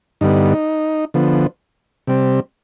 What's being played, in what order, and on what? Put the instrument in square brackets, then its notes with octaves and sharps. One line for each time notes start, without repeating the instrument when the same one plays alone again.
[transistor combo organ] G2 D3 G3 B3 D#4
D3 F3 B3
C3 G3 C4